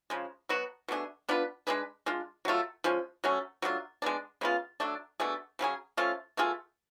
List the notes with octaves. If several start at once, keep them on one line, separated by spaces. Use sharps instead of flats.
C#3 F3 G#3
B2 F#3 B3 F#4
B2 A3 D4 G#4
B3 D4 F4 B4
G#3 D4 G#4 B4
G#3 D4 F4
F#3 A3 F4
F3 G#3 C#4
F#3 A3 C#4
F#3 A3 D4 F4
G#3 B3 D4
C#3 G#3 B3 F4
F#3 A3 D4
B2 A3 D4 G#4
C#3 F#3 C#4 G#4
F3 A3 C#4 F4
B2 A3 F4 G#4